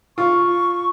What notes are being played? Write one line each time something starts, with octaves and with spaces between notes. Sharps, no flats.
F4 C#6